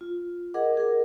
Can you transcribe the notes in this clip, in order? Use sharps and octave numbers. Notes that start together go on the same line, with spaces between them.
F4
G#4 A#4 D#5 F#5 D6
G#4 A#4